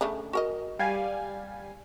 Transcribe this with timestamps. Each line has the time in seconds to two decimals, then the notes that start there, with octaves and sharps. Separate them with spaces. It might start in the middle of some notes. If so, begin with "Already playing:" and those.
0.01 C#3 A3 D4
0.33 F#4 A#4 D#5
0.79 G3 F5 G#5